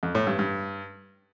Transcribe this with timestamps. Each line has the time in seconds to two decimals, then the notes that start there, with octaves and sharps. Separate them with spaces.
0.03 F2
0.15 A2
0.27 G2
0.39 G2